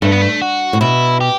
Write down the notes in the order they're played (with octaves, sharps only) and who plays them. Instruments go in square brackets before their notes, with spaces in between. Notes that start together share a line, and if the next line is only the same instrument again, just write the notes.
[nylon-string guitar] G2 [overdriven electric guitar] A3
[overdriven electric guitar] B3
A3
F#4
[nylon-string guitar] A2
[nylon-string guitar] B2 [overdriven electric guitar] E4
[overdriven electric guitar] G4